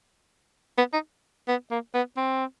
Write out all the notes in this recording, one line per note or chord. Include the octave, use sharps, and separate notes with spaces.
B3
D#4
B3
A#3
B3
C4